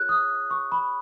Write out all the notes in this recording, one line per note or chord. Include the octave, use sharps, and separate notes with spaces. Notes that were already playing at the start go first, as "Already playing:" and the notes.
Already playing: F4 G#4 C#5 F6 F#6
D#6
C#6
B5